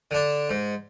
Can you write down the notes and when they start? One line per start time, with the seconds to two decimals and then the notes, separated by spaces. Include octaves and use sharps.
0.11 D3 D4
0.50 G#2